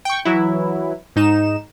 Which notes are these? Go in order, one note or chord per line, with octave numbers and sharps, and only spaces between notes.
G5 C#6
E3 F#3 E4
G#2 D#4 E7